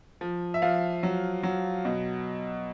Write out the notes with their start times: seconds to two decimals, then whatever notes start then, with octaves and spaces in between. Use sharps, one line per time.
0.21 F3
0.54 E5
0.62 F3 F5
1.03 F#3
1.43 F#3
1.85 B2